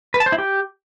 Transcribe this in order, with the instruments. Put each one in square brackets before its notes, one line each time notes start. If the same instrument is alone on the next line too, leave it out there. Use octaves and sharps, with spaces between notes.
[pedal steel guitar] B4
A5
C5
E4
G4